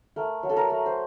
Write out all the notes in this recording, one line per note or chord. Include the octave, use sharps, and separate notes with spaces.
A3 A#4
F#3
A4
A#4
A3
C5